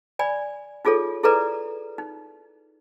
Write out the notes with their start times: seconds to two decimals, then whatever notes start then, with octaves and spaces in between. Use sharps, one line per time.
0.19 D5 G#5 B5
0.85 D#4 F4 G#4 A4 C#5
1.23 E4 G#4 A4 B4 D5 A#5
1.98 D#4